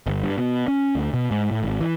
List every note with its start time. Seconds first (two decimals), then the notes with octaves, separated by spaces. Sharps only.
0.07 G1
0.23 G2
0.38 B2
0.68 C#4
0.95 D2
1.14 B2
1.31 G#2
1.51 A2
1.63 G#1
1.81 E3